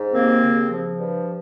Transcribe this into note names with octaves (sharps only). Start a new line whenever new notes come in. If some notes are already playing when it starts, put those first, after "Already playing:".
Already playing: G#2
D#2 A#3 C4
C#3
F3
G2